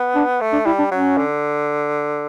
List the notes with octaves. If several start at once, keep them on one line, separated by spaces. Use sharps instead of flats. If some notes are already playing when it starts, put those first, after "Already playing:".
Already playing: B3
D4
A3
D4
G3 E4
D4
F#3 C#4
D3